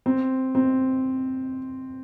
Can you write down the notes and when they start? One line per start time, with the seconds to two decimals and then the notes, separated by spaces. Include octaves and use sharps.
0.06 C4
0.55 C4